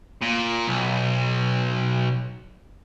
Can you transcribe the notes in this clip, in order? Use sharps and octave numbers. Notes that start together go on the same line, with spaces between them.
A#2
B1